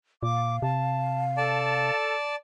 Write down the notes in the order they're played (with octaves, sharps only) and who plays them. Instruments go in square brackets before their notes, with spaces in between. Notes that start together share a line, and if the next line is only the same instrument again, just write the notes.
[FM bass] A#2 [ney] F5 [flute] D6
[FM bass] C3 [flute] A5
[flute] A4 [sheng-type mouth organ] D5 A5